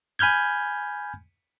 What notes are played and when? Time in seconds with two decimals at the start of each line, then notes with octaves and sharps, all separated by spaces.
0.19 G#5 B5 F6 G6 G#6